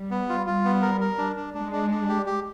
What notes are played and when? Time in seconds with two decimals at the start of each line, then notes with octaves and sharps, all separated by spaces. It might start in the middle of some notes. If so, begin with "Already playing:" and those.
Already playing: G3
0.11 B3
0.29 F4
0.47 G3 F4
0.65 B3
0.82 A#4
1.01 A#4
1.18 D4
1.36 D4
1.54 G#3 D4
1.72 D4
1.90 D4
2.09 G4
2.26 G4